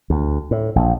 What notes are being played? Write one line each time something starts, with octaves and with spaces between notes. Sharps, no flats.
D2
A2
A#1